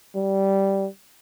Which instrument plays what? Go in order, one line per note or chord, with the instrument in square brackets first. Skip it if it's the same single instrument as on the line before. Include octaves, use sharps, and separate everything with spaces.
[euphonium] G3